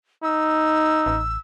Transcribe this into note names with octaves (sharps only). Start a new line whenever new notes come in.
D#4 E6
A1